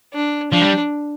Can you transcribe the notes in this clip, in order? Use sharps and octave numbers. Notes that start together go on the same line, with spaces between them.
D4
F3 D4
G3